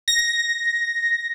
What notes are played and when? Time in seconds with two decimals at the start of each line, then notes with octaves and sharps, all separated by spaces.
0.08 A#6